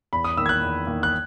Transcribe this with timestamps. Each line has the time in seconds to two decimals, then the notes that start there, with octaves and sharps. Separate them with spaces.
0.13 E2 B5
0.24 D#6
0.37 D#3 A#3 E6
0.46 G#6
0.49 F#6
0.62 E2
0.87 D#3 A#3
1.03 F#6